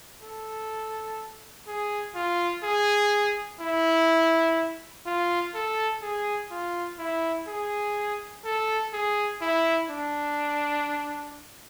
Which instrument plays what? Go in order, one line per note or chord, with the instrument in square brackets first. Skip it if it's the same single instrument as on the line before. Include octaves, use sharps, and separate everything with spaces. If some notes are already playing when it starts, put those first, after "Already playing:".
[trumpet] A4
G#4
F4
G#4
E4
F4
A4
G#4
F4
E4
G#4
A4
G#4
E4
D4